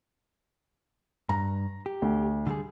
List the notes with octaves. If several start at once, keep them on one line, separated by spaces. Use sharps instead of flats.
G2 A#5
G4
D2
D3 G3 G#4